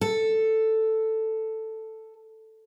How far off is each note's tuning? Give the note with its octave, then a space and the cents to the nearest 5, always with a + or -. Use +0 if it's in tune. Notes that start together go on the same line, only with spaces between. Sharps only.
A4 +5